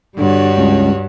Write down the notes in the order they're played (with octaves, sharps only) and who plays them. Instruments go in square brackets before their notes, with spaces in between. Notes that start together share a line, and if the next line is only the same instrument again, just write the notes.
[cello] G2 [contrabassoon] D3 [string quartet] G3 F#4 C#5
[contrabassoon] C#2